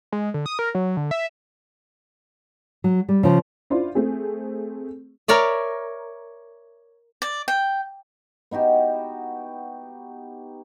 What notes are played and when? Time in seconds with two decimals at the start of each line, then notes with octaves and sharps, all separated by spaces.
0.12 G#3
0.34 D3
0.46 D#6
0.59 A#4
0.75 F#3
0.97 D3
1.11 E5
2.84 F#3
3.09 G3
3.23 C#3 F3
3.70 D4 E4 F4 C5
3.95 A3 C4 G#4
5.28 A#4 C#5 D5 E5
7.22 D5
7.48 G5
8.51 B3 D#4 F#4 G4